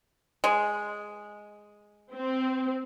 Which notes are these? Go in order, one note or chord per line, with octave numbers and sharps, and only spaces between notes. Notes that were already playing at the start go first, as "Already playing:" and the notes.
G#3
C4